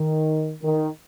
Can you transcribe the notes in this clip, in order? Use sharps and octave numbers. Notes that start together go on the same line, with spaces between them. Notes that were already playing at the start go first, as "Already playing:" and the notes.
Already playing: D#3
D#3